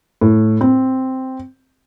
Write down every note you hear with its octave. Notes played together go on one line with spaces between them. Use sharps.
A2
C4